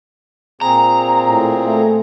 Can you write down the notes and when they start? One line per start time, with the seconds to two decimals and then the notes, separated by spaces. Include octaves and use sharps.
0.61 A#2 C4 G#4 A#5
1.28 A2
1.67 A3